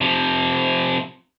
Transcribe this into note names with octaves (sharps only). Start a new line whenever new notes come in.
C3 F3